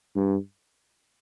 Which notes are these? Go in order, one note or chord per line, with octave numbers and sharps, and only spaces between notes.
G2